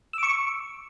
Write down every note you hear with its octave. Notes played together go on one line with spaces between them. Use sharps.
C#6 D6 E6